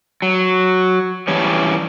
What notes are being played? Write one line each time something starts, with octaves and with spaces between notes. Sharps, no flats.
F#3
E3 G3 C#4 C#5